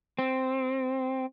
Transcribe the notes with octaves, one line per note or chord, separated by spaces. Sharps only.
C4